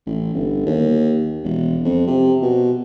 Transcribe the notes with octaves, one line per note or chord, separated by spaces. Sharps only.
A1
G1
D#2
E1
F2
C3
B2